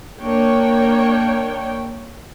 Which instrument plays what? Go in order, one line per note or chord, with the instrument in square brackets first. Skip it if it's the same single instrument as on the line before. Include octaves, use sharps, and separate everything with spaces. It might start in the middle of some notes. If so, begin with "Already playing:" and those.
[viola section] A#3 D4 C#5 G5